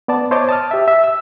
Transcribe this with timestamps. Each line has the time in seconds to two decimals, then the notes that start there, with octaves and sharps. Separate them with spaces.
0.08 B3 D5 A5
0.31 C5 C#5 D#5 A5 C6 D6
0.49 A5 D#6 F6
0.71 G4 E5
0.88 E5
1.04 E6